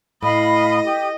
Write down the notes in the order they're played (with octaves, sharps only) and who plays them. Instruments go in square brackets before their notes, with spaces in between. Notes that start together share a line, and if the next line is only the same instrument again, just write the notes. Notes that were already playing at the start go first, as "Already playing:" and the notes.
[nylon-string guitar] A2 [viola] D#5 [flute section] F5 B5
[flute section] G4